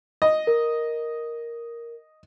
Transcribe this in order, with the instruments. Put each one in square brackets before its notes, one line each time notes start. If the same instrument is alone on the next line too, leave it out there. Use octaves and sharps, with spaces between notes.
[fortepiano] D#5
[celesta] A#4